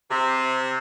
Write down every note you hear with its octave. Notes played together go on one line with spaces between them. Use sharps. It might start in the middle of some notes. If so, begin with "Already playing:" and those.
C3